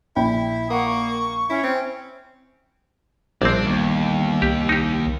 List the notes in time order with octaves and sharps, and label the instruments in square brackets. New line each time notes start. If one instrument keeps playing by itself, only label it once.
[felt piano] A#1 G5 B5 [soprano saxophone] E4
[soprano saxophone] A#3 [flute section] F#5 C#6 D#6
[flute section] C#6
[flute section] C#4 [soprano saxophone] E4
[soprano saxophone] C4
[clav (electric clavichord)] A#1 C4 [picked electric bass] G3 B3 [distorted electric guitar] D4
[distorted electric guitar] D#2
[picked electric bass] C2 [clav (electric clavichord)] G4
[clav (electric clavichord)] D#4 G4